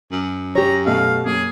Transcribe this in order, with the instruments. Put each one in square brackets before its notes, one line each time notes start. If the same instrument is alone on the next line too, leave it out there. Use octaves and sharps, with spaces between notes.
[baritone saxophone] F#2
[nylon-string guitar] G4 C#5 [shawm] A#5
[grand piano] B2 A3 D#5 [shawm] F5
[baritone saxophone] F#2 [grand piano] A#3 [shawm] G#4